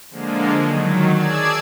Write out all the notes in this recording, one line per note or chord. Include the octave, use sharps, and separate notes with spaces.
D3 F3 G#3 A#3
D#3 F#3
G#4 D5 A5 E6 G#6